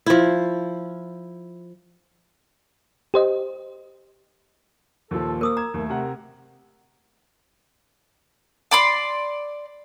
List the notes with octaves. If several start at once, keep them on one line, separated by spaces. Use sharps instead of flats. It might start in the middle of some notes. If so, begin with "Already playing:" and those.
F3 E4
G4 C5 D#5
D#2 A#2 F3 A4
A#3 A#4 C5 D#6 E6
A#5 G#6
D#2 A3
C3 A#4 F#5
D5 B5 C6